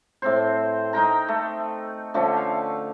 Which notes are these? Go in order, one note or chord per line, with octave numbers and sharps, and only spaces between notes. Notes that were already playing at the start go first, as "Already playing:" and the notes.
A2 C4 C5
D#4 A#4 G5 A#5
A3
D3 F3 A3 C#4
F5